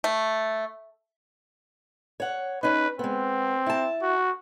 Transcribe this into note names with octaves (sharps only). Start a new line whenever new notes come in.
A3
C#5 F#5
C#4 D#4 B4
G#3 B3 C4
E4 A5
F#4